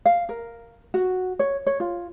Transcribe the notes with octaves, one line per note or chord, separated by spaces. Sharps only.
F5
A#4
F#4
C#5
C#5
F4